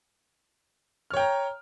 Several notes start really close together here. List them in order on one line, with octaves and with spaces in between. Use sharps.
F6 C#5 G5 A#5